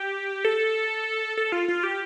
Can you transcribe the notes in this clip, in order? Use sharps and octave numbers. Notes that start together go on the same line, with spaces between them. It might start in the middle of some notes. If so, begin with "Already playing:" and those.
Already playing: G4
A4
A4
F4
F4
G4